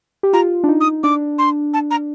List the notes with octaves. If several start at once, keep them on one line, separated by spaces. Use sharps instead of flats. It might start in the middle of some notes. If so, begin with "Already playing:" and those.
G4
F4 A#5
D4
D#4
D#6
D4 D6
C6
A5
A#5